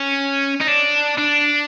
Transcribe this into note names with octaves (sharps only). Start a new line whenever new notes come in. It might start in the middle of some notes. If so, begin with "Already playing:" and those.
Already playing: C#4
D#4
D4
D4